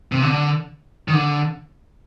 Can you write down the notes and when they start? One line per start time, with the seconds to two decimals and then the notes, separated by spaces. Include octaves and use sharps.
0.12 C3
0.22 D3
1.08 D#3
1.13 D3